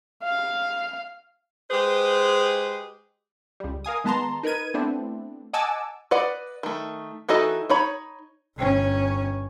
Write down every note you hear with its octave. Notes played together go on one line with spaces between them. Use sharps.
F5
G#3 G4 G#4 B4 C5
C#2 G3
A#4 F5 G#5 D#6
D#3 G#3 B3 A5 A#5 C6
D#4 A#4 B4 G#6 D#7
A3 B3 C4 D4 E4
D#5 F#5 G#5 A5 D6 E6
B4 D5 D#5 F#5
D#3 A3
E3 D#4 F#4 A4 D#5
D#4 C#5 B5
G1 C#4